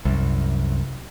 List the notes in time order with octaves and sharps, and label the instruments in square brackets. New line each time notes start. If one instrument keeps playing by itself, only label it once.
[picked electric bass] C2 F#2